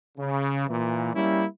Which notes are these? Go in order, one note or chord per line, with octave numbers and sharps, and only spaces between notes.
C#3
A#2 E3
G3 A#3 C#4 E4